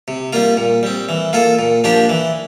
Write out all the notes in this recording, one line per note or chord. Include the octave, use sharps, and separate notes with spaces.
C3
G3 A#3 F4
A#2
G3 C4
E3
A#3 F4 A4
A#2
F3 A#3 D4 G4
E3